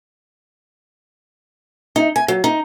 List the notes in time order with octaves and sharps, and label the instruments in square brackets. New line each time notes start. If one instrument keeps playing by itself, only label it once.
[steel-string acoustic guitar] D#4
G#5
F#3
D#4